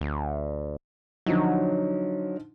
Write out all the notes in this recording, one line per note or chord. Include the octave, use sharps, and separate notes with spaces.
D2
D3 F3 F#3 D#4